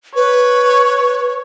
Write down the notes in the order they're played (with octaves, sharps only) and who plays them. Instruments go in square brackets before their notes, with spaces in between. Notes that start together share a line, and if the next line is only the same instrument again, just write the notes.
[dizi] B4 [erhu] C#5